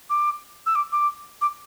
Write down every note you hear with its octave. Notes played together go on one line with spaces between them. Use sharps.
D6
E6
D6
D6
D6